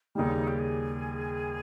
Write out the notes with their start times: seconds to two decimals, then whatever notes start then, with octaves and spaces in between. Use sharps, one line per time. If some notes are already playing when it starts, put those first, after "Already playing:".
0.15 D#2 C#3 G3 D#4
0.48 G4
0.59 G#4